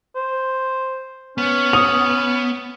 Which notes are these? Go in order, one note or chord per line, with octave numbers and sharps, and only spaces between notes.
C5
B3 C#4
D#6 F7